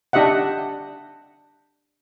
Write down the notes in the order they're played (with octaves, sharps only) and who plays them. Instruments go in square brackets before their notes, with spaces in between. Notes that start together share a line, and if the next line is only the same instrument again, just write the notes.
[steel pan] D4 G4 D#5 E5 F#5